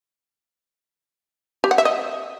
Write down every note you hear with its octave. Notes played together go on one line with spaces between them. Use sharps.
G4
F#5
E5
D#5